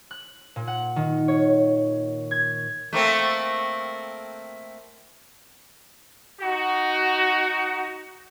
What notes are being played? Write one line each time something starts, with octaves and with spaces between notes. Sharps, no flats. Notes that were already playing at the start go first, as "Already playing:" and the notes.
F#6
A#2
F#5
D#3
C#5
G#6
A3 A#3 C4
D#4 F#4